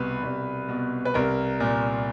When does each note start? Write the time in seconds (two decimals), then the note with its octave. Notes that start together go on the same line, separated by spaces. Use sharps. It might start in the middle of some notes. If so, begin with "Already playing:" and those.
Already playing: C2 B2 B4
0.24 C2
0.68 B2
1.05 B4
1.14 C2 A#4
1.60 A#2